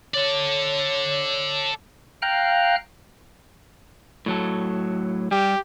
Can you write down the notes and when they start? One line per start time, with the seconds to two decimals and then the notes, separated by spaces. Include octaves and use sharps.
0.14 A4 C#5 D5
2.22 F5 G5 A#5 F6 F#6
4.26 A2 F#3 A4
5.31 G3 G4